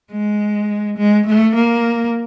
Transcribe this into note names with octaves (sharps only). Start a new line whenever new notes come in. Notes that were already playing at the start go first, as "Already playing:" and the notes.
G#3
G#3
A3
A#3